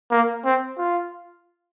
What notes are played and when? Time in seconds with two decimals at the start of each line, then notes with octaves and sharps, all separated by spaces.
0.11 A#3
0.45 C4
0.78 F4